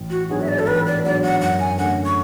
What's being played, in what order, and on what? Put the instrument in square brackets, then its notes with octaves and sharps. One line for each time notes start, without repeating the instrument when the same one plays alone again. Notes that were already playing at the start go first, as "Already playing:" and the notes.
Already playing: [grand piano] A1
[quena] F#4
[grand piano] G#2 F#3 B3 D4 [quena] G#4
[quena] E5
D5
A4
[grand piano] A1 [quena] B4
[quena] D5
[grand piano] G#2 F#3 B3 D4 [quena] D5
[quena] F#5
[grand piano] F#2 [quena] F#5
[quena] G#5
[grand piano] D3 A3 C#4 [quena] F#5
[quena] C#6